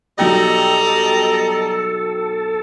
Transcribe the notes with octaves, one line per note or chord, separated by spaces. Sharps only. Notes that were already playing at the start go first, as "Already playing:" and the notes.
B1 F#3 G3 A4 D#5 G5 A#5